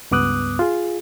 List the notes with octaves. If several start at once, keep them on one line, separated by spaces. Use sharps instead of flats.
C#2 G2 B3 D6 D#6 F#6
F4 G#4